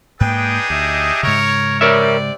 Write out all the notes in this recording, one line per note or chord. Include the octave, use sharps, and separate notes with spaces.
G#2 A#3 D4 D#4 G#4 B4 G5
D2 G4 D#5 E5
G#2 C#3 A#4 C#5
C3 G3 A#4 C#5 D5 E5